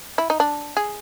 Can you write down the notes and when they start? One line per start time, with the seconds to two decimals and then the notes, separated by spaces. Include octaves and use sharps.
0.18 E4
0.30 D#4
0.40 D4
0.77 G#4